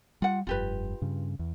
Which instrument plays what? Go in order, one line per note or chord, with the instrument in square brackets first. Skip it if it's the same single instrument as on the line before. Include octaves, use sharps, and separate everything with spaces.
[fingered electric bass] G3 [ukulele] F4 F#5
[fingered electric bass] F1 G2 [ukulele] F4 G4 B4
[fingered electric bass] G2 C#3
E2